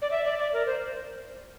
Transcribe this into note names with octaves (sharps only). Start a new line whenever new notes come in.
D5
E5
D5
D5
A#4
C5